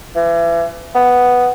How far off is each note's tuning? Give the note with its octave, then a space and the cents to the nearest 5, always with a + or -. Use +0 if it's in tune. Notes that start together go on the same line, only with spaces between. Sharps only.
E3 +35
B3 +0